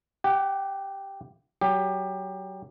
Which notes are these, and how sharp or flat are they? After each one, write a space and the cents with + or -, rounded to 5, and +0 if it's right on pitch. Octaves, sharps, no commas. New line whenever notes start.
G4 +0 F#5 +30
F#3 +30 G4 +20